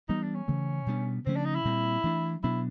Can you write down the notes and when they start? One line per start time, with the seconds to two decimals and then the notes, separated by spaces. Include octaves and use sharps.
0.09 E3 G3 B3 D#4
0.23 D4
0.35 C#4
0.48 C#3 E3 A3
0.86 B2 G3 B3 D4
1.26 C#3 F3 A3 C4 C#4
1.36 D4
1.45 D#4
1.56 E4
1.65 A#2 G3 C4
2.04 E3 A3 D4
2.44 B2 F#3 B3 D4 E4